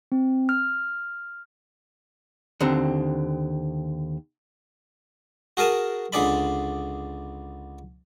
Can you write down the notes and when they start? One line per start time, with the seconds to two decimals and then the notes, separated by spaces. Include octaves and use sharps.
0.12 C4
0.49 F6
2.60 D#2 D3 C4
5.57 F#4 G#4 A#4 G#5 A5
6.13 C#2 D3 G#4 D5 B5